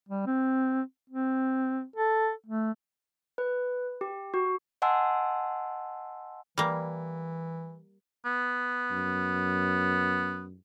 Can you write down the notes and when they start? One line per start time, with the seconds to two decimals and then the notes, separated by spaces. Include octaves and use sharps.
0.09 G3
0.26 C4
1.09 C4
1.96 A4
2.46 A3
3.38 B4
4.01 G4
4.34 F#4
4.82 D#5 F#5 G#5 A5 C6 E6
6.58 E3 G3 A#3
8.25 B3
8.91 F#2